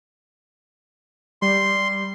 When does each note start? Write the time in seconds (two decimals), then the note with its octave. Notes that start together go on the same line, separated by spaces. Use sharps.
1.42 G3 C6